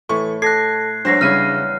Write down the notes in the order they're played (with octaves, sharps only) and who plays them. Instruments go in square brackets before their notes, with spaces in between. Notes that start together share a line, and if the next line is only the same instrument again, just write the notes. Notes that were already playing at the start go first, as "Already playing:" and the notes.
[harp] A2 [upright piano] E3 C#6 [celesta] A4
[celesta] A4 A5 A#6 [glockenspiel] F#6 C7 [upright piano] G#6
[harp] E2 G#2 F#3 [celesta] D4 A#6 C7 [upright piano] C5 C#5
[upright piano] C#3 D#7 [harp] G3 E4 C#5 [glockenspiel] F6